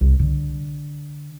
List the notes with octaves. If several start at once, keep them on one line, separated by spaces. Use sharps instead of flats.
C2
D3